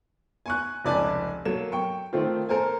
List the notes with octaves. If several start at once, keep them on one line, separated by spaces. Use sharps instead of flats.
G#5 C#6 F#6
F1 C#2 D5 G#5 A5
F#3 A#3 A4 E7
G5 C#6
D#3 A3 C4 F4
A4 A#4 C5 G#5